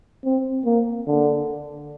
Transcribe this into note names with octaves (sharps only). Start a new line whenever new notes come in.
C4
A#3
D3